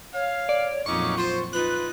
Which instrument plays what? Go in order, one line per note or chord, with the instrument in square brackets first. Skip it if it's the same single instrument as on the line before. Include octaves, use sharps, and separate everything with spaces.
[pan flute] C#5 [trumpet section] F5
[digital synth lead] D5
[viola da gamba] F2 A#2 F#3 [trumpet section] C#4 D#4 [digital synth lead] C#6 [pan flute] D6
[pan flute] F4 [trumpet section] C5
[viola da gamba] D#4 [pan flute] F4 [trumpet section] B4 [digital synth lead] F#6